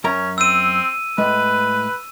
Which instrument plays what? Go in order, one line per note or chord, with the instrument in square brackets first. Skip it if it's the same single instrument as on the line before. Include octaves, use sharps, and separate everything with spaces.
[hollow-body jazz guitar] F#2 A#4 A#5 [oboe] C#4
[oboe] C4 [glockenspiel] E6 D#7
[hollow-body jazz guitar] A2 G#3 [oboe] B4